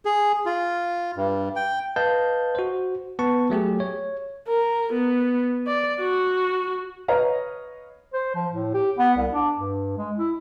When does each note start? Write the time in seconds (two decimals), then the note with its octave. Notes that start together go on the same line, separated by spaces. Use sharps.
0.05 G#4
0.46 F4
1.16 G2
1.56 G5
1.96 B4 D#5 F5 A5 G6
2.55 F#4 C5
3.19 B3 B4 A5 C#6
3.50 F#3 A3 G4 G#4
3.80 C#5
4.48 A#4
4.93 B3
5.67 D5
6.00 F#4
7.08 B4 C#5 D#5 F5 A#5
8.13 C5
8.35 F3
8.52 A2
8.74 G4
8.99 B3
9.17 C2
9.33 D4
9.58 G2
9.98 G#3
10.17 E4